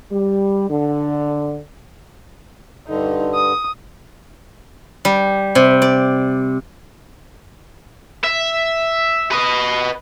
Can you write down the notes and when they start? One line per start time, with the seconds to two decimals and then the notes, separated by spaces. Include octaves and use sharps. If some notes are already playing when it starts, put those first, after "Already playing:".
0.11 G3
0.69 D3
2.87 G2 D3 D#4
3.35 D#6
5.05 G3
5.55 C3
5.82 D5
8.24 E5
9.32 B4 D#5